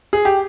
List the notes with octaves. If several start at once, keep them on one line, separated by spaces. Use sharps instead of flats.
G#4
G4